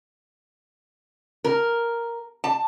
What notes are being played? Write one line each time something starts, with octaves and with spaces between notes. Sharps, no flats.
A#4
A5